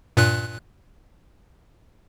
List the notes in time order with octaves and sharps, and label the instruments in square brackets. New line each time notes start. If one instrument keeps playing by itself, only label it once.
[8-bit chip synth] G2 A#2 F#6